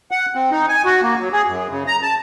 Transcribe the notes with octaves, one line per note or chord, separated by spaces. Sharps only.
F#5
C4
D#4
G#5
F#4
A#3
F#3
G#4
F#2
C#3
A#5
A5